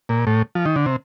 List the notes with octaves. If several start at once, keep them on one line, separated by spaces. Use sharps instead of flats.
A#2
A2
F3
D#3
D3
C3